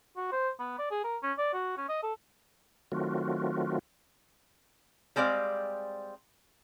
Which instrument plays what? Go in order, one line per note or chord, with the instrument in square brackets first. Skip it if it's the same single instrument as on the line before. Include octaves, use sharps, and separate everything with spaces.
[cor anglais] F#4
C5
B3
D5
G#4
A#4
C#4
D5
F#4
C#4
D#5
A4
[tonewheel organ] D#3 F#3 A3 C4 F4 F#4
[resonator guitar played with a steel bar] G3 G#3 C4 D5 F5